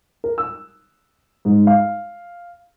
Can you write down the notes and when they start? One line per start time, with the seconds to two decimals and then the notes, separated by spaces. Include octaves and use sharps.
0.24 A#4
0.38 E6
1.45 G#2
1.67 F5